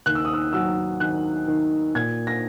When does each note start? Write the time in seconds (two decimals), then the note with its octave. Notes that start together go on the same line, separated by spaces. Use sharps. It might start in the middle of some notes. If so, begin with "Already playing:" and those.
0.06 D#2 F#6
0.15 E6
0.25 D#6
0.33 E6
0.53 F#3 E6
1.00 D#3 F#6
1.48 D#3
1.95 A#2 G#6
2.27 A#6